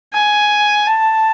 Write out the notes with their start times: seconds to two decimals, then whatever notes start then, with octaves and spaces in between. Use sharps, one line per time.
0.14 G#5
0.87 A5